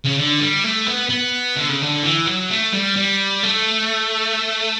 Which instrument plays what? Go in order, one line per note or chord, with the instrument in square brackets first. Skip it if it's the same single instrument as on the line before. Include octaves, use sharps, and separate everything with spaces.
[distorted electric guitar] C#3
D3
G3
A3
B3
B3
D3
C#3
D3
E3
F#3
A3
G3
G3
A3